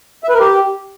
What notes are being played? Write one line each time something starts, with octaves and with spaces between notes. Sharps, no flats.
E5
B4
A#4
G4